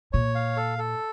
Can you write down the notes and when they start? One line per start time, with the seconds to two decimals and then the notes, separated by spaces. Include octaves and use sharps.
0.13 A#2 C#5
0.35 F5
0.56 A4
0.78 A4